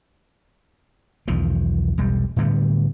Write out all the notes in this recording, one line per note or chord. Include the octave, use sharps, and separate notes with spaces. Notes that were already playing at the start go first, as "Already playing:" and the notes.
B1 E2 D#3 F3
E1 B1 G3
A2 D3 G3 B3